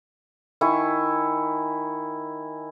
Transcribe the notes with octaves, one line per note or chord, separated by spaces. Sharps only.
D#3 E4 G#5 C#6